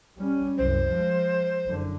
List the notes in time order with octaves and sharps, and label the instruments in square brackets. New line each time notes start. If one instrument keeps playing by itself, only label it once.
[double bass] G3 C#4
[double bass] C2 F#2 [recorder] C5
[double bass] F3 G#3
F#1 D3